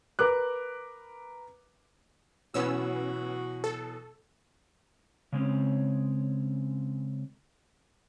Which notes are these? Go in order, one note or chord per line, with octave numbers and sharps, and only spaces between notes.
A#4 B4 D6 F#6
B2 E3 F#3 B3 C#4 F#4 E6
A4
C#3 G#3 C4 C#4